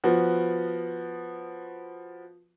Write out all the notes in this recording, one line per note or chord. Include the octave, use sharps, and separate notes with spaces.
F3 B3 F#4